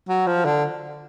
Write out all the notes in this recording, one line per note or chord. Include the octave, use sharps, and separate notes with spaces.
F#3
F3
D3